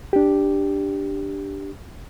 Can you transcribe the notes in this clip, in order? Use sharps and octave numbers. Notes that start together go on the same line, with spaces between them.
D4 G4